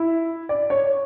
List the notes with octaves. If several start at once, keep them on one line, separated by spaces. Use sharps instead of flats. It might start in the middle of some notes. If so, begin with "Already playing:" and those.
Already playing: E4
D5
C#5